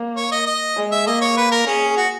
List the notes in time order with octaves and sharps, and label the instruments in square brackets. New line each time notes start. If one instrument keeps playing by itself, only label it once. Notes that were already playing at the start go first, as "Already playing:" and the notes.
Already playing: [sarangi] A#3
[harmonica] C#5
D#5
D#5
[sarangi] G#3
[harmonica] E5
[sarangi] A#3 [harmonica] D#5
[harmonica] C#5
B4
A#4
[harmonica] C#4 [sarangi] G#4
[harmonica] F#4